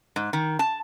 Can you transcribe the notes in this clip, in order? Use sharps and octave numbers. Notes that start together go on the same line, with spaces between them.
G#2
D#3
A5